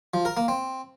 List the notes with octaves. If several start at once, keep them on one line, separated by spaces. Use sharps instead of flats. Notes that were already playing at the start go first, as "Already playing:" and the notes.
F3
A#4
A#3
C4